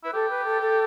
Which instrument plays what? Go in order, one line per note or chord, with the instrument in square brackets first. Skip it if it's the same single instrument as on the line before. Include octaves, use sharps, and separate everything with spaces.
[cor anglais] E4 [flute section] B4
[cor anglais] G4 [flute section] A4
[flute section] B4
A4
A4